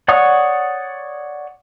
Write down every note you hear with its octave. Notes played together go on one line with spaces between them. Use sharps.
C#5 D5 F#5 C#6 D#6